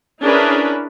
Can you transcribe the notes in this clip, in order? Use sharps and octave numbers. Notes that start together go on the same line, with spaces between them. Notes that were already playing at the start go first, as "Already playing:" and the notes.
C#4 D4 E4 G#4 A#4 B4